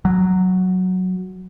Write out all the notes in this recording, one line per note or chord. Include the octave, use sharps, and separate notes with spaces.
F#3